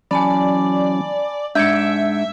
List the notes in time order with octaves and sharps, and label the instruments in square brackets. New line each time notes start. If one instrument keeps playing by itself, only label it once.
[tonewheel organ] E3 F#3 C#4 [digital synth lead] D5 [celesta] G#5 A5 B5
[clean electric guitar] G#2 D4 [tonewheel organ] G#3 [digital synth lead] E5 [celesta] G6 G#6 C#7